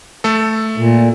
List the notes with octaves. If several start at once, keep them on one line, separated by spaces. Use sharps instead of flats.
A3 A4
A#2